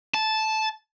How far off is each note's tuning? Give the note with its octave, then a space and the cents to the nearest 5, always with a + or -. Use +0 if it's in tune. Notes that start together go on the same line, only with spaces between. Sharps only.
A5 -10